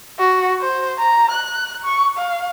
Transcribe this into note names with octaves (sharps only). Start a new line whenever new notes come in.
F#4
C5
A#5
F#6
C#6
F5